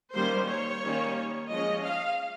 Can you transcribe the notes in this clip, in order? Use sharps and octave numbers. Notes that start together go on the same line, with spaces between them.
D#3 G3 A#3 C#4 C5
C#5
D#3 G3 A#3 C#4
F3 G#3 C#4 D#5
F5